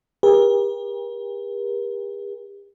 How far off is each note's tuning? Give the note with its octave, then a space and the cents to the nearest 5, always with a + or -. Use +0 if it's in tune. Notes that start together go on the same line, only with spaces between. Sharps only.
G4 +40 A#4 +45